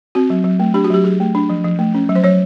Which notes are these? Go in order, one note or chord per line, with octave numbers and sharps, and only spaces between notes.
C4 F#4
F#3
F#3
A3
D4 G4
F#4
F#3 G4
F#3 G#4
A3
D4
F3
F3
A3
C#4
F#3
C5
F#3 C#5